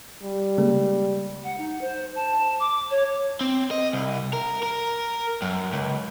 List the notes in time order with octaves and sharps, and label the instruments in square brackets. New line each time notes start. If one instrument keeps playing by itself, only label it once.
[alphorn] G3
[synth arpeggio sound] C#3 G#3 A#3
[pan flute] F#5
D#4
C5
A5
D6
C#5
[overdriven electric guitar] C4
D#5
C2
A#4
A#4
F#2
C#2